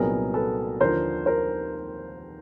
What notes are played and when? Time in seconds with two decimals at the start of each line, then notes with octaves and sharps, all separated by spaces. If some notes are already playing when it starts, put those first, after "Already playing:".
Already playing: C2 A#2 F#3 B3 D#4 G#4 A#4
0.34 A4 B4
0.80 D#2 D3 F3 A#4 C5
1.26 A#4 C5